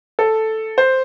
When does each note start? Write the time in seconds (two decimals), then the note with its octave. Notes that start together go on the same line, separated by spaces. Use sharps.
0.19 A4
0.78 C5